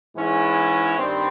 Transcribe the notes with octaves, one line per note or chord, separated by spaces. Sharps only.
G#2 E3 G#3 C#4 E4
G2 D#3 G3 C4